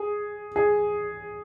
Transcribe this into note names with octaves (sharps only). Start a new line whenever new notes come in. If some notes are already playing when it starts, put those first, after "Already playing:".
Already playing: G#4
G#4